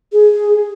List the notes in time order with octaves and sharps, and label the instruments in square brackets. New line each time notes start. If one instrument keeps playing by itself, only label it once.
[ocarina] G#4